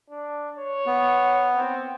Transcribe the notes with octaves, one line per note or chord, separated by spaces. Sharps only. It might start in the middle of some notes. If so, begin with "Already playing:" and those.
D4
C#5
B3
C4